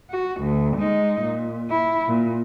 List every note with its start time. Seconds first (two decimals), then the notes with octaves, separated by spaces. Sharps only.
0.10 F#4
0.41 D2
0.77 G#3 D#4
1.22 A#2
1.70 E4
2.08 A#2